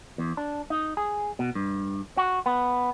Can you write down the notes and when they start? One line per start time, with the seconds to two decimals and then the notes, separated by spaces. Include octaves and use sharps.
0.18 E2
0.37 D4
0.70 D#4
0.97 G#4
1.39 B2
1.55 G2
2.17 F#4
2.46 B3